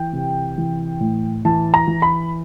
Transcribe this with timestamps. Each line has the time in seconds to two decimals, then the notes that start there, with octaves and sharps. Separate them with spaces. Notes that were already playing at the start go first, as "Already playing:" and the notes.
Already playing: E3 G5
0.13 C3
0.58 E3
1.00 A2
1.45 E3 A5
1.74 A#5
1.88 E3
2.02 B5